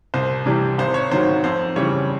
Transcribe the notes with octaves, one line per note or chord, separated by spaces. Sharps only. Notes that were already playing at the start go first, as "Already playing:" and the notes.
C2 C5
C3 E3 G3
G#1 C5
C#5
G#2 D#3 F#3 C5
F2 C5
C#3 E3 G3 C#5